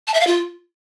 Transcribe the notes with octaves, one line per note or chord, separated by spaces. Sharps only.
A5
E5
F5
F4